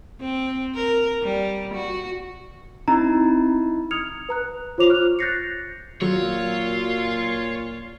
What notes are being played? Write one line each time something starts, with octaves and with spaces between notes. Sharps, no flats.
C4
A#4
G3
F#4
C4 D#4 E4 A#5
D#6 F6 G#6 C#7 F7
B4 A#5 F#6
F4 C5 C#5 D6 F7
C#6 F6 F#6
F#6 G6 A6 A#6 C7 C#7
A#2 F#3 F4 C#5